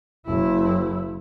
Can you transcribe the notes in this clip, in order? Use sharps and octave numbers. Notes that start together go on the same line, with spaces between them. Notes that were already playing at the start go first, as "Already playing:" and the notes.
F#1 E4